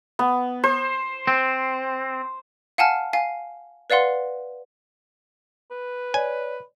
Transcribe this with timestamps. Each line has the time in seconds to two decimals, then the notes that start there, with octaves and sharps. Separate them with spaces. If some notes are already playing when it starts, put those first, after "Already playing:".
0.19 B3
0.64 C5
1.27 C4
2.78 F5 F#5 G#5 A5 F6
3.13 F5 G#5
3.90 B4 D5 F5 F#5 C6
5.71 B4
6.14 C#5 D5 G#5